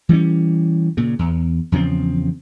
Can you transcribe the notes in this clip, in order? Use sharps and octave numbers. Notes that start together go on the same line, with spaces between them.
E3 G3 A3 C#4
A#2 C#3
E2
E2 C#3 F3 C4